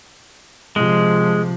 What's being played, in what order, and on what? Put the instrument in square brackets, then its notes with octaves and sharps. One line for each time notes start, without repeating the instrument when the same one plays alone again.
[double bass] C3 F3 [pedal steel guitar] G#3